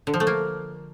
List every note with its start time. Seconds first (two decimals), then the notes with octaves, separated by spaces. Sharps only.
0.07 D3
0.14 F3
0.20 A3
0.27 A#3